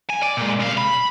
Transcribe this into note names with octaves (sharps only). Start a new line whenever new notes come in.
G#5
D5
A#2 G#3
C2 F5
B5